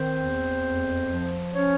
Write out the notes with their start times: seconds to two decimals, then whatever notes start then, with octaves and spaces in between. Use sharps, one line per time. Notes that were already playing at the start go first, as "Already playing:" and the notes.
Already playing: D#3 C4 C5
0.17 E2
0.63 F2
1.08 F3
1.54 C#4 C#5